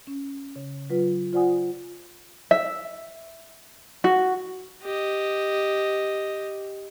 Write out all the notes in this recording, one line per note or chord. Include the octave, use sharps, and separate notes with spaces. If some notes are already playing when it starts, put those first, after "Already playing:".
C#4
C#3
F#3 F4 B4
F4 C5 D5 F#5 G#5 D#6
E5
F#4
G4 D#5